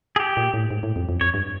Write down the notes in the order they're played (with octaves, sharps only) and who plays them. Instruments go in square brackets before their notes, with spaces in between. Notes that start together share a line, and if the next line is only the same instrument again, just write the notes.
[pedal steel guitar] G#4
G4
[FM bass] A#2
A2
G#2
A2
F2
F2
[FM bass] F2 [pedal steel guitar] C#5
[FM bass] G2